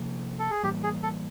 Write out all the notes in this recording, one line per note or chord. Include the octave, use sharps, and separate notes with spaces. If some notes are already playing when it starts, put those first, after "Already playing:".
Already playing: C3 F3 A#3
A4
G#4
A2 E3 G3 A#3 G4
G#4
A4